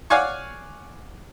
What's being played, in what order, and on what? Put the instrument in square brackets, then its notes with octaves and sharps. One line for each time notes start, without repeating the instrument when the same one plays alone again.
[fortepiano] C#5 D5 F5 F#5 G#5 C#6